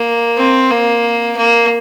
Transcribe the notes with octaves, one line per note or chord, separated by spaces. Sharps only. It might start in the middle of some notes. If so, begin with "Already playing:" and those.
Already playing: A#3
C4
A#3
A#3